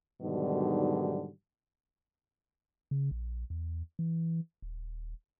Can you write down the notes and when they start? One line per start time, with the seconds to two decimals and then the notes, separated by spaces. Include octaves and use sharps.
0.22 G#2 B2 D3 D#3 F#3 G3
2.91 C#3
3.11 A#1
3.50 E2
3.99 E3
4.62 D#1